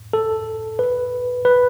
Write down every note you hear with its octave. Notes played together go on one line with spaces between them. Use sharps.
A4
B4
B4